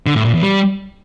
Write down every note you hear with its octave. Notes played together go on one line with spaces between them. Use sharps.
D3
A2
A#2
E2
G3